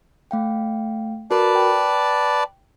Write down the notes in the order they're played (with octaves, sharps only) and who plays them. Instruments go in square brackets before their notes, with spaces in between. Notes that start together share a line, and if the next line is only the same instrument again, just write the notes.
[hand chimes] A3 F5 G5
[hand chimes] F#4 A#4 B5 [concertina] B4 D5 A5
[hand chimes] G5